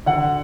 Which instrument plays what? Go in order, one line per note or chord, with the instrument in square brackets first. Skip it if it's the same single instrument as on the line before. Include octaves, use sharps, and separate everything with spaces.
[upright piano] D3 F#5